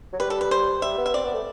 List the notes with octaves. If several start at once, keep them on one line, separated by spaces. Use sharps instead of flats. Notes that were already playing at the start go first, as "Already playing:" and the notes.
F#3
G3 B4
A4
B4
C5
G3 E5
B3
E5
C4 D5
B3
A3